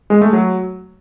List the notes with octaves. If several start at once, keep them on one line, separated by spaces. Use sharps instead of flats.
G#3
A3
F#3